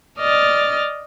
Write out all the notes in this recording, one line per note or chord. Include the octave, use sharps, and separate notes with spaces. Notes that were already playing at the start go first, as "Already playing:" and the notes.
D5 D#5 F6 A6